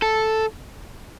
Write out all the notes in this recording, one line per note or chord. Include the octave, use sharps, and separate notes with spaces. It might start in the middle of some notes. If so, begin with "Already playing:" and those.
A4